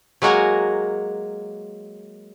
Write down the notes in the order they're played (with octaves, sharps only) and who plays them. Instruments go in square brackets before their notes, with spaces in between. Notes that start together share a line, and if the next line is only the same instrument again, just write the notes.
[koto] F#3 G#3 A#3 F#4 A#4 G#5